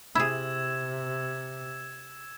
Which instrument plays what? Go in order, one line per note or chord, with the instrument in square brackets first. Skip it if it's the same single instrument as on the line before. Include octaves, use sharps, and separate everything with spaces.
[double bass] C3 [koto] E4 G#4 [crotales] E6 G#6 E7